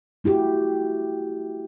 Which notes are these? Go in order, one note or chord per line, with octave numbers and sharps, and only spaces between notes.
A3 E4 F#4 G4